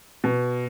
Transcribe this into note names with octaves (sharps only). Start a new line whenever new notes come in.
B2